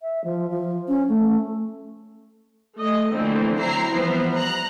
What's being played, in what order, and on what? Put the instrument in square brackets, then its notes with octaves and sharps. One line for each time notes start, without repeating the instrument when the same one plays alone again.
[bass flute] E5
F3
F3
C#4
A3
[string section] A3 D#5
D3 E3 F3 A3 A#3 C4
F#3 C4 E4 A#5 C7
E3 F3 G3 B3 C5
A#5 F#6